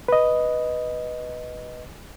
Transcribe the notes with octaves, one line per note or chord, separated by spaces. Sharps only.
B4 D#5